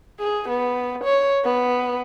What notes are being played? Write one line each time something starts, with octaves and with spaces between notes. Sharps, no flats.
G#4
B3
C#5
B3